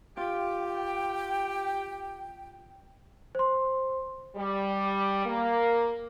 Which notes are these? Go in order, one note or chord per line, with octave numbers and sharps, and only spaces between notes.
F4 G4 G5
C5 C6
G3
A#3